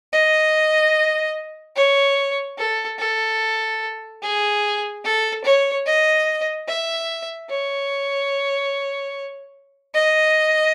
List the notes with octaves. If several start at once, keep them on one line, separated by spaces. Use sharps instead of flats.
D#5
C#5
A4
A4
G#4
A4
C#5
D#5
E5
C#5
D#5